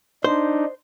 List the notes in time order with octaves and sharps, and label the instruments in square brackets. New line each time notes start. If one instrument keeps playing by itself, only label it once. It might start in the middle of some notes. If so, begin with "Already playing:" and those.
[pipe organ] D4 D#4 [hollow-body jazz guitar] C5